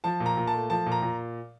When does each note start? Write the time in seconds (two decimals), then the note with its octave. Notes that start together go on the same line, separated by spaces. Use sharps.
0.04 F3 A5
0.20 A#2
0.26 A#5
0.37 A#2
0.47 A5
0.54 A3
0.70 F3 A5
0.86 A#2
0.92 A#5
1.02 A#2